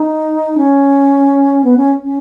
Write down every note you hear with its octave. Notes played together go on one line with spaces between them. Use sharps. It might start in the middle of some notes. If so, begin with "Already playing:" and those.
Already playing: D#4
C#4
B3
C#4
C#4